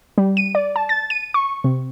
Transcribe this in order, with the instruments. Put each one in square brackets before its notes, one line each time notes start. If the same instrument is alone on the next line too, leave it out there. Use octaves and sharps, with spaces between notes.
[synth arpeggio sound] G3
D#7
D5
A5
A6
D#7
C#6
C3